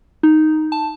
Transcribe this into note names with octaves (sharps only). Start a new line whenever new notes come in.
D#4
A5